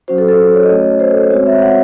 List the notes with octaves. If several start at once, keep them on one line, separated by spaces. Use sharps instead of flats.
F#3 C#4 F#4 C5
A4
A4
C#5
D#5
A3 C#4 F#4 C#5
C#5
C5
A4
C5
G#3 C4 F#4 C#5
E5
F#5